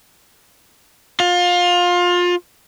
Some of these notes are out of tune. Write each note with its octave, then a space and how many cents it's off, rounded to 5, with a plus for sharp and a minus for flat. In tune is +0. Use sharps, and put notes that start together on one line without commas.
F4 +25